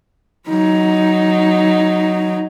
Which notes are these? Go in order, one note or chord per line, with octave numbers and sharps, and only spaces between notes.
F#3 D#4